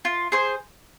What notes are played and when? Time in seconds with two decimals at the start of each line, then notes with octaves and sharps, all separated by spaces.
0.05 F4
0.32 G#4 C5